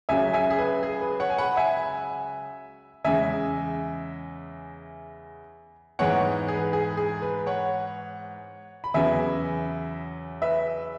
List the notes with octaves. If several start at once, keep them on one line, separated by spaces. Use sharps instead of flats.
C#2 C#3 F#3 E5 G#5
E5 G#5
G#4
B4
G#4
B4
C#5 F#5
G#5
F#5 B5
E5 G#5
E2 C#3 G#3 E5 G#5
G#2 E3 G#3 B3 C#5 F#5
G#4
B4
G#4
G#4
B4
C#5 F#5
B5
E2 C#3 F#3 B3 E5 G#5
B4 E5